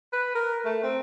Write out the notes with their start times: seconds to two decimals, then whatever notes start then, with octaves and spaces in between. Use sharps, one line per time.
0.13 B4
0.35 A#4
0.65 A3
0.83 C4